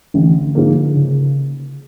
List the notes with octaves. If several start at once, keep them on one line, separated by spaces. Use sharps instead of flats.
A1 D3
G#2 F3 A#3
C#3